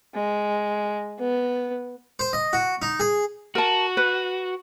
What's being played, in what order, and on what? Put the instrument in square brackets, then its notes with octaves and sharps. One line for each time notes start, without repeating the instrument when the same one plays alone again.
[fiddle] G#3
B3
[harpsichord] C5
D#5
F#4
D#4
G#4
[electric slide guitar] F#4 [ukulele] A#4 A5
[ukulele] B4